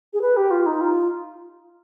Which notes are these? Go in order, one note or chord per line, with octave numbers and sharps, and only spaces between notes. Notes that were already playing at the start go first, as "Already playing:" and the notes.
G#4
B4
G4
F4
D#4
F4